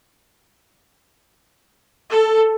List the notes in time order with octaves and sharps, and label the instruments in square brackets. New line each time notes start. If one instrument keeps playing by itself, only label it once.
[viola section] A4